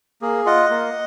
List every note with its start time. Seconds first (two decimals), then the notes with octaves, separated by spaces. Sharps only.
0.22 A#3 G#4
0.46 F4 D#5 F#5
0.70 A#3